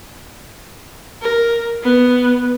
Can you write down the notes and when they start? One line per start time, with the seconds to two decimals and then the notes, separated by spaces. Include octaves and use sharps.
1.22 A#4
1.83 B3